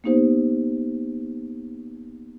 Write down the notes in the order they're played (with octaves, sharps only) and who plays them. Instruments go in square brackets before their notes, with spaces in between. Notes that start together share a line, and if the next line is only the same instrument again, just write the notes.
[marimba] A#3 B3 D#4 G4 C5